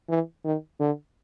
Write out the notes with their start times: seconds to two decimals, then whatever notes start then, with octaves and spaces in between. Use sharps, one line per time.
0.09 E3
0.44 D#3
0.80 D3